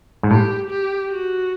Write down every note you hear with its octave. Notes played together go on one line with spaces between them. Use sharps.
G#2
A2 G4
G4
F#4